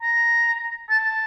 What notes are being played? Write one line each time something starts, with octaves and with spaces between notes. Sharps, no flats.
A#5
A5